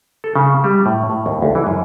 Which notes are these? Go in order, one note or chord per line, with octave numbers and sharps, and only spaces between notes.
A4
C#3
G3
A2
A2
D#2
D2
E3
F#2